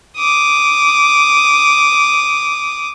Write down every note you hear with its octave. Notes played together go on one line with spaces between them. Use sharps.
D6 D#6